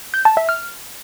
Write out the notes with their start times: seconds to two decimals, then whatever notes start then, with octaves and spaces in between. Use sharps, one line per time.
0.14 G6
0.25 A5
0.37 E5
0.49 F6